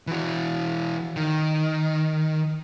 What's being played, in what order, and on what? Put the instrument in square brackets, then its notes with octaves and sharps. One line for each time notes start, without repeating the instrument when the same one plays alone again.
[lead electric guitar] E3 F#4
D#3